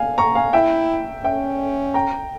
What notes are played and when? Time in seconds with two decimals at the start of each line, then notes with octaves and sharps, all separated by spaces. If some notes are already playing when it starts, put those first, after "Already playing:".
Already playing: F5 G#5
0.18 A#5 C#6
0.35 F5 G#5
0.53 E4 E5 G5
1.24 C#4 E5 G5
1.94 G5 A#5